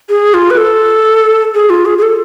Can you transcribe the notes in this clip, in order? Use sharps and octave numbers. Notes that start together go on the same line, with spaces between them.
G#4
F4
B4
A4
G#4
F4
G#4
G#4
A4